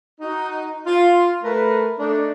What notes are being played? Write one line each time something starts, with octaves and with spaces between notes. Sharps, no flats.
D#4 F#4
F4
A3 A#4 B4
A3 D4 D#4